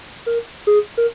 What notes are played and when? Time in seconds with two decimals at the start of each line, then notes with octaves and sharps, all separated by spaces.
0.26 A#4
0.67 G#4
0.97 A#4